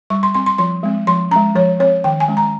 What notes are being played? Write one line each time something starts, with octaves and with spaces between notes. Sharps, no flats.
G3 C#6
C6
C4 C6
C6
F3 C6
G#3 C4
F3 C6
G#3 C#4 A#5
F3 C#5
C4 C#5
D#3 G5
G#5
G#3 C#4
A#5